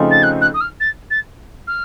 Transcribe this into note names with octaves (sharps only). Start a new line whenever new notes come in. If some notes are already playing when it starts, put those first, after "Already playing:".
Already playing: C#3 F3 A3 C4 D#4
A6
F#6
F#6
D#6
F6
A6
A6
F6